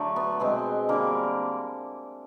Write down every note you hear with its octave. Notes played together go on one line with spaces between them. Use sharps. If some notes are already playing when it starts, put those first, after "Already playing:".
Already playing: D3 F#3 A3
B3
B2 G#3 C4
D3 G3 A#3